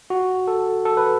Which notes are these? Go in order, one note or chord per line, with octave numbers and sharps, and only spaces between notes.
F#4
A4
A4
B4